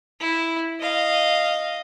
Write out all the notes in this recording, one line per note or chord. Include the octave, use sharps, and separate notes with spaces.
E4
D#5 F5